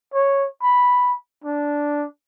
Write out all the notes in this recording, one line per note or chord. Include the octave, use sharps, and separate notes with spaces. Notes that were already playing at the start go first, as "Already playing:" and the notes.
C#5
B5
D4